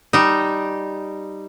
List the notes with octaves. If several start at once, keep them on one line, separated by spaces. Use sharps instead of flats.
G3 D#4